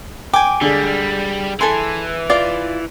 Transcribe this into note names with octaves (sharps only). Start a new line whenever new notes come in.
G5 G#5 D6
D3 G3 G#3
E3 A4 G#5 C6
F4 D5 D6